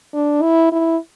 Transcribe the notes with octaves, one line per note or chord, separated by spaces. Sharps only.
D4
E4
E4